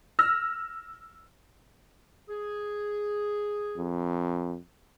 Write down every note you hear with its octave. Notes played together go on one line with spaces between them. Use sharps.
E6 F6 A#6
G#4
F2